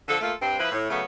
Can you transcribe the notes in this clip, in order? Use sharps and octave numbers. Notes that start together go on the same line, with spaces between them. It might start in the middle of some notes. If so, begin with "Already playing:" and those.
D3 F3 A4
A3 A#3 F4 A4
G2 C4
F3 E4 B4
A2
C#3 F#3 A3 B3